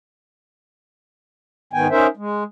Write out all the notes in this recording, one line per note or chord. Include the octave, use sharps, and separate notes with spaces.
G#2 D#3 B3 G5 G#5
C#4 D#4 A#4 C5 E5
G#3